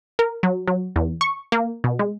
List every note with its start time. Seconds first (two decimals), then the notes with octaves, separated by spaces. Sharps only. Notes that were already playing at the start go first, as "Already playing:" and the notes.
0.19 A#4
0.43 F#3
0.68 F#3
0.96 E2
1.21 C#6
1.52 A#3
1.84 B2
1.99 G#3